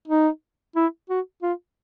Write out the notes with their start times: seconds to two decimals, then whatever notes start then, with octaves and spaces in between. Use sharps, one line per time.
0.08 D#4
0.76 E4
1.10 F#4
1.42 F4